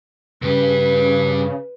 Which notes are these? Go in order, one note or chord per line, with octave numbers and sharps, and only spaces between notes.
G2 C#3 G4 B4